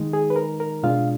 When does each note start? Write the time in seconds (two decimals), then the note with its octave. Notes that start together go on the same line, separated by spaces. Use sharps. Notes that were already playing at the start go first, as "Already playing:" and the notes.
Already playing: D#3 G#3 D#4
0.13 G#4
0.30 B4
0.36 A#4
0.60 A#4
0.83 B2 G#3 D4 F4 F5